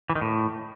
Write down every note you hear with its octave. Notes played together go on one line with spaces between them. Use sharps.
E3
D#3
A2